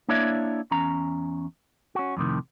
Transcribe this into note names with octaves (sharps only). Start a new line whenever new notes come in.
A#3 D4 E4 C#5 D5 E5
E2 C#4 A#5
C#4 F#4
F2 A2 C3 D#3